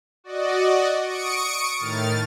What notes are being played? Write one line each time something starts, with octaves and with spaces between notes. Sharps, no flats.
F#4 D5 D#5
C#6 D#6 C#7 D7
A2 D#3 F6 A6